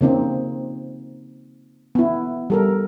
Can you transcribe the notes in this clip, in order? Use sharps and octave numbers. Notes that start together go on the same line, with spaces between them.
C#3 A#3 C4 D#4
B3 E4
G3 A4 A#4